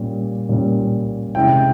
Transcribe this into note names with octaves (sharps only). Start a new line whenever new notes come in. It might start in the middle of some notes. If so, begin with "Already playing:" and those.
Already playing: A#2 G3 C#4
A#2 G3 C#4
C3 E3 G#3 C#4 E4 G5